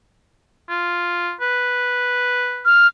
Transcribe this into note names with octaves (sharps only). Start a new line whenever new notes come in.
F4
B4
F6